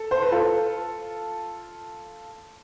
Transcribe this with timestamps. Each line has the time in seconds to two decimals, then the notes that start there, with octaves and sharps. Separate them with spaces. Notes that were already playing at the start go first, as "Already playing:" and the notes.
Already playing: A4
0.11 C5
0.22 B4
0.32 F4 A4